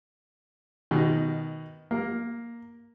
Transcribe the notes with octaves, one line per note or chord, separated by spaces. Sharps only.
B2 D#3
A#3